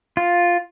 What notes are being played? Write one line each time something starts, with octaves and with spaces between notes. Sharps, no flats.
F4